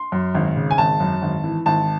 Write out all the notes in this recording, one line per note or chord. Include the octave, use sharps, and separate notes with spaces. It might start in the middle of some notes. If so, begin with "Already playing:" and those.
Already playing: C6
F#2
G#1
C#3
G#5
G#1 A5
F#2
G#1
E3
G#1 A5